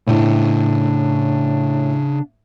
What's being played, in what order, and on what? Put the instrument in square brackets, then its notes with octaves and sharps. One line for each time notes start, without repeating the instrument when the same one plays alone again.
[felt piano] A2 [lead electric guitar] C#3 C5 [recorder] D4